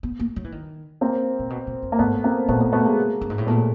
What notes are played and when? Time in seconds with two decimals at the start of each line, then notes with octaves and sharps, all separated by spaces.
0.03 B3
0.19 A#3
0.36 F#3
0.44 E3
0.52 D#3
1.01 A#3 C4
1.39 A#2
1.50 B2
1.67 A#2
1.83 F#2
1.92 A#3
1.99 G#2 A3 B3
2.24 A#3 C4
2.48 A#2 A3 B3
2.60 A3 B3
2.73 A3 B3
2.85 G#3 A#3
3.21 G2
3.30 G#2
3.38 A2
3.47 A#2 A3 B3